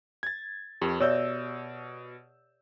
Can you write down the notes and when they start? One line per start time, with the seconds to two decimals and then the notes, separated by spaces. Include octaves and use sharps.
0.23 G#6 A6
0.82 F2 G4 A#4
1.00 B2 C#5 D5 E5 E6 G6